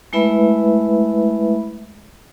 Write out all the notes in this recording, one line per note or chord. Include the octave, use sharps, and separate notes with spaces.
G#3 A3 E4 B4 E5 B5